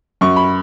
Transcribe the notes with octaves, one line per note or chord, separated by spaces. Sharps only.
F#2 C#6
B5